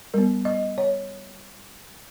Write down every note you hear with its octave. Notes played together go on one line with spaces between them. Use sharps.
G3 B3 A#4
D#5
C#5